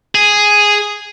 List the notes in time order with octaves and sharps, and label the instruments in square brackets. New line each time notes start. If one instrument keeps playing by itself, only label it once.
[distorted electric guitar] G#4